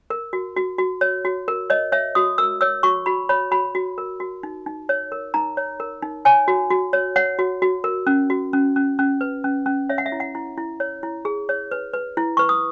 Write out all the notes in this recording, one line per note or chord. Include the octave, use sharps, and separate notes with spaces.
A#4
F#4
F#4
F#4
C#5
F#4
A#4
C#5 D#5
C#5 E5
F#4 D#6
A#4 E6
C#5 E6
F#4 C#6
F#4 B5
C#5 B5
F#4 B5
F#4
A#4
F#4
D#4
D#4
C#5
A#4
D#4 A#5
C#5
A#4
D#4
C#5 G#5
F#4
F#4
C#5
C#5 F#5
F#4
F#4
A#4
C#4
F#4
C#4
C#4
C#4
B4
C#4
C#4
C#5 E5
F#5
E5
E4
F#5
E4
E4
C#5
E4
G#4
C#5
B4
B4
E4
B4 C#6
D#6